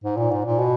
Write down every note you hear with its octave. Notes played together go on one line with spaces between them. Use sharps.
G#2
A#2
G#2
A#2
B2